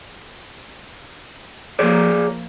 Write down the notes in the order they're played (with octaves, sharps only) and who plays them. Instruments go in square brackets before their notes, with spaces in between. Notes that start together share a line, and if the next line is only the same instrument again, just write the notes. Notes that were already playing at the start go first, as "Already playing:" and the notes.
[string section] F3 A#3 [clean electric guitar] G#4 C#5 D5